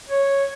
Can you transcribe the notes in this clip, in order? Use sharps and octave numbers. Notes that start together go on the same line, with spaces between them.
C#5